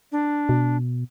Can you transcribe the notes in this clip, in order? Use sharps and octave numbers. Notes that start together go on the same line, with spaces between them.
D4
B2